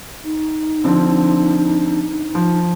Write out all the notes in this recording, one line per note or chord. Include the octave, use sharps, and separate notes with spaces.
D#4
D3 F3 C4
F3